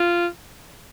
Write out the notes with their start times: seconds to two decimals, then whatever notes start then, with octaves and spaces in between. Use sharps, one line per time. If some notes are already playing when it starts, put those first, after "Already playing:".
Already playing: F4